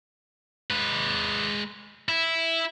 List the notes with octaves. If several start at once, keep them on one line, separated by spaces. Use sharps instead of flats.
G#3 B4
E4